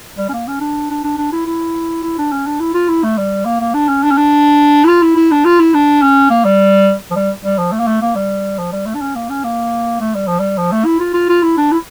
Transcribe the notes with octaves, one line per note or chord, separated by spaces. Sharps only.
G3
C#4
A#3
C#4
D4
D4
D4
D4
E4
E4
E4
D4
C#4
D4
E4
F4
E4
A3
G3
A#3
A#3
D4
C#4
D4
C#4
D4
E4
F4
E4
E4
D4
F4
E4
D4
C#4
A#3
G3
F3
G3
G3
F3
A3
A#3
A3
A#3
G3
F3
G3
A3
D4
C#4
A#3
C#4
A#3
A3
G3
F3
G3
F3
A3
E4
F4
F4
F4
E4
D4
E4